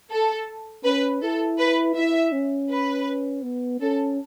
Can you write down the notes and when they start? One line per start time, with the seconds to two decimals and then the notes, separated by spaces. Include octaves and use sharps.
0.11 A4
0.84 C#4 B4
1.22 E4 A4
1.59 B4
1.95 E4 E5
2.32 C#4
2.69 B4
3.43 B3
3.81 C#4 A4